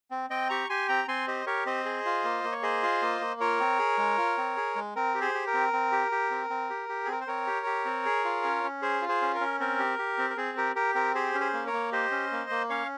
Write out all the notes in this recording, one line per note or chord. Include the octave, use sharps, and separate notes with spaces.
C4
C4 D#5 G5
G4 A#5 C#6
G4 G#5 C6
C4 G5 A#5
C4 G#5 C6
G4 C5 D#5
G4 A#4 C#5
C4 C5 D#5
G#4
F4
A#3
A#3
C#5
G#4 C5 D#5
F4
A#3
A#3
F4 A#4 C#5
C4
G#4
G#3
F4
C4
G#4
G#3
C4 A#4
G4
G#4 C5
G4
A#4
C4
C4
G4
G4
C4
C4
G4
G4
G#4
C4 A#4
C5
C4 A#4 C#5
G4
G4
C4
G#4
F4
C#4
C#4
G#4 C5
F4
G#4 C5
C#4
A#4
C#4
C4 A#4
G4
G4
C4
A#4
C4 G#4
G4 A#4
G4 A#4
C4 A#4
G4 G#4 C5
C#4
G#4 C5
A#3
A#4 C#5
A#3
G4 C5 D#5
C#4
A#3
A#3
C#4 C#5 F5